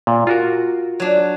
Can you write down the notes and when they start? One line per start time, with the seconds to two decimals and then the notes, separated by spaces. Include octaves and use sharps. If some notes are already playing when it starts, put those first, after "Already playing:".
0.07 A#2
0.27 F4 F#4 A#4
1.00 F#3 D4